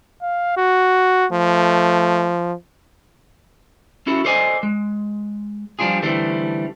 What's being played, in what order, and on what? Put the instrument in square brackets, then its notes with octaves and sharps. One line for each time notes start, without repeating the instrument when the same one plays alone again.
[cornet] F5
F#4
[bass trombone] F3 [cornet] A3
[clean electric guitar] C#4 E4 F#4 A4
A4 C5 D5 D#5 G#5
G#3
F3 G3 C#4 D4 F4 G#4
D3 E3 G3 A3 C4